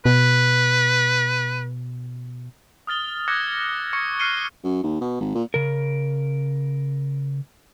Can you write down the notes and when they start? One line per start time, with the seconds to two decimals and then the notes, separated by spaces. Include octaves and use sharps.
0.05 B2 B4
2.87 D#6 F6 A6 G7
3.28 D6 E6 F#6 G#6 A#6 C#7
3.93 C#6 G#6 C#7
4.19 F6 F#6 C7 C#7 D#7 G7
4.64 F#2
4.83 D#2
5.01 B2
5.20 G#1
5.35 A#2
5.54 C#3 A#4